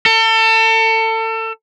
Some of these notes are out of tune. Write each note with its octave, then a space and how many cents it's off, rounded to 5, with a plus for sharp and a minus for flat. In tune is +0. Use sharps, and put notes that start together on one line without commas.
A4 +30